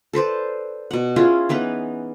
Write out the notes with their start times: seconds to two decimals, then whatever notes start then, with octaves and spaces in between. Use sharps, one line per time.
0.13 A4 B4 C5 D5
0.91 B2 F#5
1.16 C#4 E4 F4 G#4
1.49 E3 B3 D#4 B4